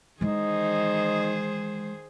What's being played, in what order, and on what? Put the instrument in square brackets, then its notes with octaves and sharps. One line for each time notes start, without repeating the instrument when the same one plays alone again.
[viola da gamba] D#3 G#4 C5 [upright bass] E3 G#3 [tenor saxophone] D#4